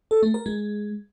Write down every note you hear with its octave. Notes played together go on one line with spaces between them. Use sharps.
A4
A3
A#4
G#3